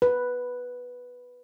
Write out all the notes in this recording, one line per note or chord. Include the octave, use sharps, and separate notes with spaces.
B4